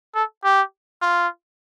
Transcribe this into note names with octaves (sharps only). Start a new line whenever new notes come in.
A4
G4
F4